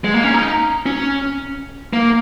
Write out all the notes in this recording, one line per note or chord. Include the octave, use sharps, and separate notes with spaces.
G#3
A#3
C#4
D#4
C#4
A#3